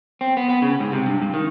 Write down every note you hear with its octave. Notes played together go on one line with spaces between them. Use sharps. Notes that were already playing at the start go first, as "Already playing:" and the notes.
C4
B3
B3
C#3
G#2
C3
G2
G2
D#3